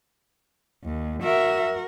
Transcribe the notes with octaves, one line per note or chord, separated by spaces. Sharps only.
D#2
F#4 A#4 E5